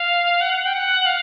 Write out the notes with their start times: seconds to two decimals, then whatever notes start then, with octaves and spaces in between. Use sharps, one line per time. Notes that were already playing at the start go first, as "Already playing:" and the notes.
Already playing: F5
0.41 F#5
0.66 G5
0.73 F#5
1.06 F5